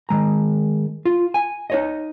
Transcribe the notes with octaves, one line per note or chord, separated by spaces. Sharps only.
D#3 G#3 A#5
F4
G#5
D#4 C#5 D#5